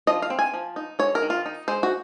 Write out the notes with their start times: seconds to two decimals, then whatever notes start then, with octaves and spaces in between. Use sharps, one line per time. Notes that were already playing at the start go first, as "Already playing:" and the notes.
0.07 F3 D#5
0.22 F5
0.30 C4
0.39 G#5
0.54 F3
0.76 D#4
0.99 G#3 C#5
1.15 A#4
1.22 D#3
1.30 F4
1.46 D#4
1.68 G#3 C5
1.83 F#4